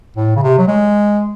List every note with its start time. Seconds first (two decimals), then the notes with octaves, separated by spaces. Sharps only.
0.17 A2
0.36 C#3
0.43 C3
0.58 F#3
0.68 G#3